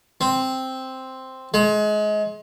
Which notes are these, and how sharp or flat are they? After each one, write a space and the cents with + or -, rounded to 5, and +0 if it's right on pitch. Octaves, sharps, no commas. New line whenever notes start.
C4 +0
G#3 +30